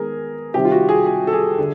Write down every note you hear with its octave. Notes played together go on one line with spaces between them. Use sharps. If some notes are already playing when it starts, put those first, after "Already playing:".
Already playing: D#3 G#3 B3 G#4 A#4
C3 D#3 G3 C4 G4
F4
F#4
G#4
G#4
A4
G#4
D3